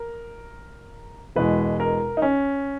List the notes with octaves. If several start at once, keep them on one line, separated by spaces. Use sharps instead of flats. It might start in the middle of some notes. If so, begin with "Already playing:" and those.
Already playing: A#4
E1 E2 B2 G#3 B4
A#4
D#4
C#4